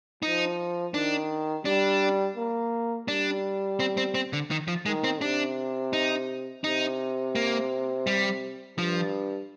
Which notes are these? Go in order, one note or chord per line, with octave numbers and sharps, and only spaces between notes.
F3 D#4
D#3 D4
G3 D4
A#3
G3 D4
C4
C4
C4
D3
D#3
F3
D#3 G#3
C4
C3 D4
D#4
C3 D#4
A#3
G3
G2 F3